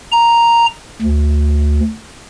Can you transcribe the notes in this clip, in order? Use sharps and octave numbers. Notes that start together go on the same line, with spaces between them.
A#5
D2